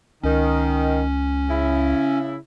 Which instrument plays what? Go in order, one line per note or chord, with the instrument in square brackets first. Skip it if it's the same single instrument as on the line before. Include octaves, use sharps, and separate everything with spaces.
[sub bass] C#2 [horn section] D#3 [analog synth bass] C#4
[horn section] C#3 E4